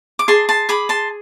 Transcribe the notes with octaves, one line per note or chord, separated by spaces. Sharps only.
D6
G#4 A5 C6
A5 C6
G#4 B5 D6
A5 C6